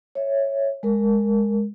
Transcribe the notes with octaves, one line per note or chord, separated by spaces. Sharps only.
C#5 E5
G#3 A#4